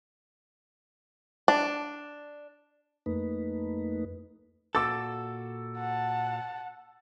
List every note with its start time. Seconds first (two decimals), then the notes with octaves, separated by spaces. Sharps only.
1.48 D4
3.06 F2 A3 A#3 D#4 B4
4.75 A#2 F#4 A4 D6 E6 A6
5.78 F#5 A5